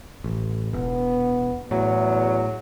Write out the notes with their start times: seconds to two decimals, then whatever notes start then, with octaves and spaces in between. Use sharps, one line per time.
0.24 A1
0.73 E1 B3
1.71 E2 A2 F#3